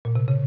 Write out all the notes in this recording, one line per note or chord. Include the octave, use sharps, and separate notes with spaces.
A#2
C3
C#3